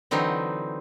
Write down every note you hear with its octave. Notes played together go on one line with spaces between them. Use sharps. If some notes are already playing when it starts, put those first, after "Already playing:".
D3 E3 F#3 C4 D#4